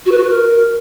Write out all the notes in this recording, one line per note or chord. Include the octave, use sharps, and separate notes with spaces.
F#4
B4
F#4
B4
A#4